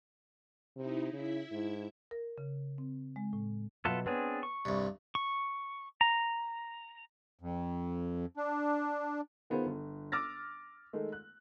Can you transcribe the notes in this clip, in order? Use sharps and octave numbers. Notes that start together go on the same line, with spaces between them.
C3 D#4 E4
C#3 E4 E5
G#2
A#4
C#3
C4
G#3
A2
B2 F#3 B3 F4 A4 E5
B3 C4 D4 G#4 C#5
C#6
C2 G2 C3
C#6
A#5
F2
D4
D#3 B3 F4 G#4 C5
G1
D6 E6 F6 A6 A#6
D#3 G#3 A3
F#6